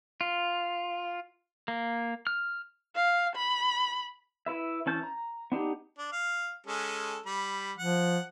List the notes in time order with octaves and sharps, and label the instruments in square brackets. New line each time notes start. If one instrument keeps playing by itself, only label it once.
[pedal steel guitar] F4
A#3
F6
[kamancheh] F5
B5
[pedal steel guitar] E4 B4 E5
E3 C#4 A5 G6
A#5
B3 D4 D#4 G4
[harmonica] D4
F5
G#3 C#4 A4
G3 B5
[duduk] F3 [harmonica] F#5